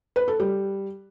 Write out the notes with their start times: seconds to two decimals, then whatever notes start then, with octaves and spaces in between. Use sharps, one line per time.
0.16 B4
0.28 A4
0.40 G3